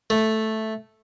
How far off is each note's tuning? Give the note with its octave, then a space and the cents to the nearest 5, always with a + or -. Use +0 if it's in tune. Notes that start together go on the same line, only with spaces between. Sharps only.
A3 +0